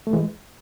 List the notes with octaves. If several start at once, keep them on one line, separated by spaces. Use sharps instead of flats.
A3
E3 G#3